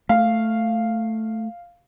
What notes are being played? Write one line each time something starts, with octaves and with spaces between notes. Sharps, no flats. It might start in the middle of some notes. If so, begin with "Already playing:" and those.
A3 F5